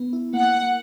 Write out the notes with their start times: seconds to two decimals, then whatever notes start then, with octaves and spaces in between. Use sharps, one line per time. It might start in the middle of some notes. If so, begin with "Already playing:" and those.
Already playing: B3
0.13 E4
0.33 A#3 F#5
0.54 A#3